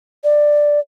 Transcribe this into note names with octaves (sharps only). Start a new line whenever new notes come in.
D5